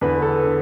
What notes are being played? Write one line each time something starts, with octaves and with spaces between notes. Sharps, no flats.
E2 D3 B4
A4
D3